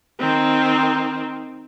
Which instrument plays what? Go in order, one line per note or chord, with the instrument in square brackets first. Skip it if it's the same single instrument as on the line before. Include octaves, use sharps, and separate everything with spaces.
[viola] D#3 C4